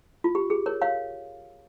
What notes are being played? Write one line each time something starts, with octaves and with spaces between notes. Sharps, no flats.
F4
G4
G#4
A#4 C#5
C#5 F5